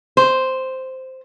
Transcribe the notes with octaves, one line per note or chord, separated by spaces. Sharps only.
C5